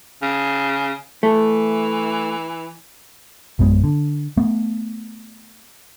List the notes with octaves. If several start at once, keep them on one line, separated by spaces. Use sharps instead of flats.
C#3
E3 A3
A#1 F#2 G#3 B3
D3
A3 B3